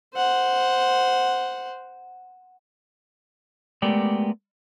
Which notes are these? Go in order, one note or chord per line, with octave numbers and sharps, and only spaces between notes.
C5 F#5
G#3 A3 B3 G4 A#4 D5